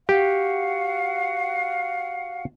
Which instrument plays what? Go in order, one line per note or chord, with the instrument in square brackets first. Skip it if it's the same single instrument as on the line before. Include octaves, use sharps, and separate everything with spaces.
[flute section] F#4 F5 F#5 [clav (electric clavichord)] G4